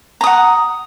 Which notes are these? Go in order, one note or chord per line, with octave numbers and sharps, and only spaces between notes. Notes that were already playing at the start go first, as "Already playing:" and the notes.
F#5 A#5 D#6